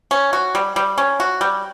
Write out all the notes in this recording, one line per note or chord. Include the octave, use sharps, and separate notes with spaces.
C#4
F#4
G3
G3
C#4
F#4
G3